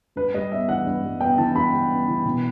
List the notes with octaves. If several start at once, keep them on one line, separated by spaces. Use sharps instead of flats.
G2 B4
G3 D#5
B3 E5
E3 F#5
G2
G3
B3 G5
E3 A5
G2 B5
G3
B3
E3
B2